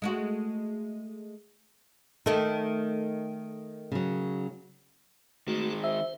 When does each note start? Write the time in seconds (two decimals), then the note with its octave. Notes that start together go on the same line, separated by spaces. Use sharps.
0.02 G#3 A3 F#4
2.26 D#3 A3 A4
3.92 C#3 F#3
5.48 D#3 G#3 A3 F#4
5.84 C5 E5